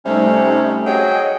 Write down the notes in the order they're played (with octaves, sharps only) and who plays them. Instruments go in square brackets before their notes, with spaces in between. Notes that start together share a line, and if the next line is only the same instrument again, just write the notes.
[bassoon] C3 [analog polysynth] G3 A3 D#4 [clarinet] C#4
[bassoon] F#3 [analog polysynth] G#4 D#5 [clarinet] G5